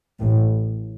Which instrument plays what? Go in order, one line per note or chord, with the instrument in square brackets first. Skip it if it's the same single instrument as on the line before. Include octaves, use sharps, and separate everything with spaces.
[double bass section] A1 A2